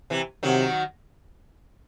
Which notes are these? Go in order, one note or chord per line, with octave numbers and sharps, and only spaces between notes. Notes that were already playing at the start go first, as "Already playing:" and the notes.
C3 E3
C3 D#3 F#3